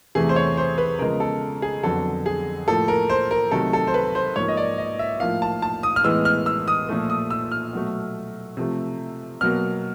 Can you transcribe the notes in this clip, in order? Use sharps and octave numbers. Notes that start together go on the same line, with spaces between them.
E2 C3 E3 A3 G#4
C5
C#5
C5
B4
C#3 F3 G#3 B3 A#4
A4
G#4
F2 D3 F#3 B3 A4
G#4
A2 F3 A#3 A4
A#4
C5
A#4
C3 D#3 F#3 A3 A4
A4
C5
B4
C5
G#2 F3 A#3 C#5
D#5
D5
D#5
E5
A2 F3 A#3 F5
A5
A5
D#6
F6
A2 E3 G#3 B3 E6
F6
E6
D#6
A#2 F3 A3
D#6
E6
F6
B2 F#3 A3
C3 F3 A3
B2 F#3 A#3 F6